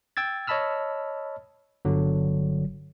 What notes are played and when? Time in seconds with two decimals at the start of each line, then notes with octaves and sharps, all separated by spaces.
0.17 G5 E6 G#6 A6
0.47 C#5 D#5 A5 B5 E6 F6
1.85 G1 D3 F#3